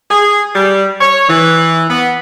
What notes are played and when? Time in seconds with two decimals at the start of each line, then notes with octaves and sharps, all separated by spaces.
0.10 G#4
0.55 G3
1.00 C#5
1.29 E3
1.89 B3